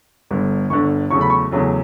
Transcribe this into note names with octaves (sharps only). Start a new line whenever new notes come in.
G1 G2 D3
G1 G2 D3 C#6
E2 C#3 F#3 A3 C#6
B5
C#6
E2 C#3 F#3 A3